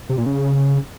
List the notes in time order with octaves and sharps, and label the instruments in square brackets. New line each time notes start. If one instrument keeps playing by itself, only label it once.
[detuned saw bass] C3
A#2
C#3